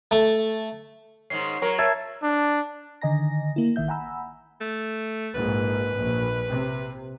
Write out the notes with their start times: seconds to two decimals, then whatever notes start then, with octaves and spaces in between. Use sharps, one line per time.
0.11 A3
1.30 G#2 D#3 C#4 C7
1.62 F#3 A#4 C#5
1.79 E5 A5 G#6 A6
2.23 D4
3.01 D3 D#3 D#5 G#5 A#5 A#6
3.56 A#3 E4
3.76 A1 D#3 E5 G6
3.88 F#5 G#5 A#5 B5 E6
4.61 A3
5.35 A#1 G#2 B4
5.98 A#1
6.48 C3